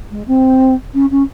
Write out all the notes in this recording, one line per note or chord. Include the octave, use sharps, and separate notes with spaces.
G#3
C4
C#4
C#4